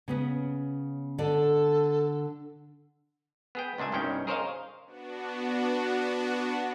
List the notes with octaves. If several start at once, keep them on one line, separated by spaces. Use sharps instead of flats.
C#3 B3 C#4
D3 A4 D5
B3 G#4 G5
C#2 A#2 D4 E5 G#5
C2 G2 B2 D#3 C#4 G5
G#4 A#4 C5 C#5 D#5 F5
B3 D4 F#4